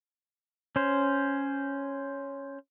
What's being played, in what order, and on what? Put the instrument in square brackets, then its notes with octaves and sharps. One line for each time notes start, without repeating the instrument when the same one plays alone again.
[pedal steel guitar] C#4 C5